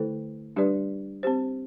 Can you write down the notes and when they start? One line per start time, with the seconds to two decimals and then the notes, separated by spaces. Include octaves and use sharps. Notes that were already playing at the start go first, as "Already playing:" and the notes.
Already playing: D3 A3 E4 A4 C5
0.56 G3 D4 G4 B4 D5
1.23 C4 G4 C5